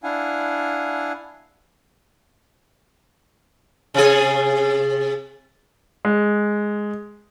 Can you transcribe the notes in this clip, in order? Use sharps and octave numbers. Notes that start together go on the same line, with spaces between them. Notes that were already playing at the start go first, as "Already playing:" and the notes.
D4 E4 F5 F#5 G#5
C3 G#4
G#3